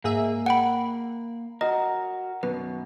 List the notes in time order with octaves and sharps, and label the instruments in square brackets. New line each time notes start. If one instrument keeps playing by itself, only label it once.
[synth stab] G#2 G#4 E5 [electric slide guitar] A#3
[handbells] F#5 G5 B5
[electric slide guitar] F#4 A#4 [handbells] D#5
[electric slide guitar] F#2 B2 [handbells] B4